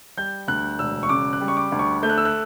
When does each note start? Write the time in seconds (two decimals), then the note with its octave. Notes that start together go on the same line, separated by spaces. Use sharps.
0.17 G3 G6
0.48 D2 F#6
0.79 E1 E6
1.03 C#6
1.09 C#3 D6
1.33 F#6
1.41 G3
1.48 C#6
1.57 D6
1.72 D2
1.79 C#6
2.03 A3 G6
2.10 F#6
2.18 E6
2.25 F#6